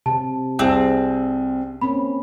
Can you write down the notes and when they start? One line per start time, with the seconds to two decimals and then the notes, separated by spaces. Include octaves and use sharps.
0.06 C3 A5
0.59 C2 C4 G#4
1.82 A#3 C4 C#4 B5